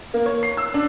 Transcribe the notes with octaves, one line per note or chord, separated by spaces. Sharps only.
A#3
C#5
C7
E6
D4